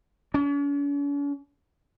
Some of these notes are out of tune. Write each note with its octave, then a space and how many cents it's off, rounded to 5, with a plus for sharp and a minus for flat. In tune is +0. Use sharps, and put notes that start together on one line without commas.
C#4 +45